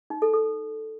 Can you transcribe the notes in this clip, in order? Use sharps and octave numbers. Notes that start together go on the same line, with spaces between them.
D#4
A4
A4